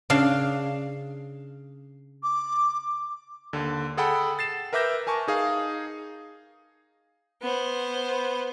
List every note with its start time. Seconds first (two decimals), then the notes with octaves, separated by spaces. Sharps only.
0.10 C#3 D4 F5
2.23 D6
3.53 D#2 D3
3.97 G#4 A4 F#5 G5 B5
4.39 A6 C7 E7
4.73 A#4 B4 E5 D6 G6 A#6
5.07 A#4 G#5 A5 C#6
5.28 D#4 G#4 F5
7.42 B3 C5